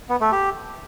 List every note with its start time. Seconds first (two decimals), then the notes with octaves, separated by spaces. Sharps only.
0.09 B3
0.21 A3
0.32 G4